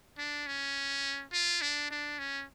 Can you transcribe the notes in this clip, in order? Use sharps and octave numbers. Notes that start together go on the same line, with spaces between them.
D4
C#4
F4
D4
D4
C#4